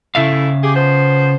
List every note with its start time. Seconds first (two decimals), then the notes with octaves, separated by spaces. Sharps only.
0.15 C#3 A3 E4 E5 F5
0.62 G4 G#4
0.75 F3 B3 C5